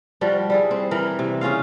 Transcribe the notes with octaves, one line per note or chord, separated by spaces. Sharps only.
F3 G3 F#4
G3 E4 G#4
C4
E3 A#4
C3
C#3 C#4 F4 F5